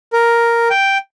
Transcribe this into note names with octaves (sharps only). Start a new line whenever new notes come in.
A#4
G5